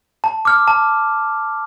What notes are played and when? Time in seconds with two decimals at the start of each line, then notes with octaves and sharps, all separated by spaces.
0.24 A5
0.45 D6 F6
0.68 A5